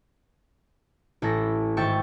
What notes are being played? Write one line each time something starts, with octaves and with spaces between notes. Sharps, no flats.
A1 E4 A4 A#6
G#1 E5 G5 C#6 A6